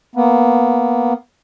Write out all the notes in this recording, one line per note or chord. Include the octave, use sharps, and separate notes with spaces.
A#3 B3